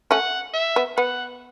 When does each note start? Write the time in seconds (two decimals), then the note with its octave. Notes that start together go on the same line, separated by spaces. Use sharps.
0.11 A3 C#4 F#5
0.54 E5
0.76 B3
0.97 B3 F#5